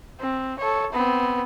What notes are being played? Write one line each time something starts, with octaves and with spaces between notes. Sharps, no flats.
C4
A4 C#5
B3 C4